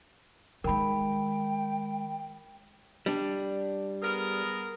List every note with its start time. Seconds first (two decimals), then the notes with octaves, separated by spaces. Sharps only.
0.64 D#3 G#3 A#4 G5 B5
3.06 G3 D4
4.02 B3 G#4 A#4